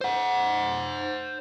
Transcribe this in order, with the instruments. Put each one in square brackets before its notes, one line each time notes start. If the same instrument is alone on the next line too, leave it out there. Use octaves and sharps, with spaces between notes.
[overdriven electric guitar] C5 F#5